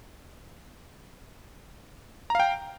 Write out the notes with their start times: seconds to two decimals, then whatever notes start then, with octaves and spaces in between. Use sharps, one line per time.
2.30 A#5
2.35 F5
2.40 G5